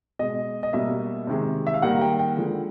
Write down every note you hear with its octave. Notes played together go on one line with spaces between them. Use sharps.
B2 G#3 D#5
D#5
B2 G3 A#3 E5
C3 D#3 G#3
E5
F5
D#3 G3 A#3 F#5
G5
G5
D3 F3 G#3